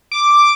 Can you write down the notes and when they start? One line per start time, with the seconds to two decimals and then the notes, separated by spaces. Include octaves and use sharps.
0.12 D6
0.31 D6